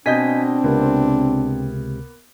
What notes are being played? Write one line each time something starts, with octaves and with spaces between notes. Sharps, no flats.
B2 C4 D4 D#5 G#5 G6 B6
C#2 C3 A#3 B3